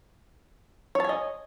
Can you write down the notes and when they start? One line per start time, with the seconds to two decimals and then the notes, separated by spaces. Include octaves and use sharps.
0.95 C#5
1.00 A5
1.04 G#5
1.09 D#5